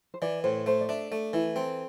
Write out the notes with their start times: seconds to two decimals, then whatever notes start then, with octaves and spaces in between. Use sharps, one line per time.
0.14 C5
0.22 E3 D5
0.44 A2 C5
0.66 A3 C5
0.81 D5
0.89 D4 E5
1.11 A3 D5
1.33 E3 E4
1.56 C4 A4